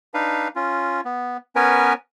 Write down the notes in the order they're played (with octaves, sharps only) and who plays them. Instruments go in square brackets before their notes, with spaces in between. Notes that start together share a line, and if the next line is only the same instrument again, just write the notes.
[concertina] D4 D#4 B4 F5
C#4 F4
B3
B3 C#4 A#4 B4 C#5 G#5